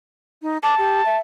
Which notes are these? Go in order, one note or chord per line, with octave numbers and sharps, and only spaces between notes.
D#4
A5 D6
G4
E5